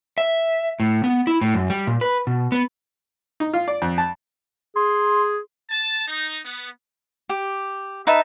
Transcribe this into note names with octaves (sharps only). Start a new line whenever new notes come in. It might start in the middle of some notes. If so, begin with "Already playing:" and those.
E5
A2
B3
E4
A2
F#2
G3
A#2
B4
B2
B3
D#4
F4
D5
F2
A5
G#4 C6
A5
D#4
B3
G4
D#4 B4 E5 A5